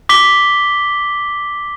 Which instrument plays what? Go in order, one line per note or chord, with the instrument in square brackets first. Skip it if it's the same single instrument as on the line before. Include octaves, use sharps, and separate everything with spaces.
[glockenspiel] D6 B6 G7